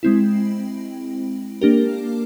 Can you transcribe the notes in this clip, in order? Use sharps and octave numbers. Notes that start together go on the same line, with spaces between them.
G#3 C4 E4
A#3 D4 G4 A#4